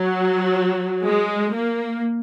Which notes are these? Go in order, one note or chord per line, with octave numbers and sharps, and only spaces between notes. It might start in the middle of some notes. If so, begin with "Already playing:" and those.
Already playing: F#3
G#3
A#3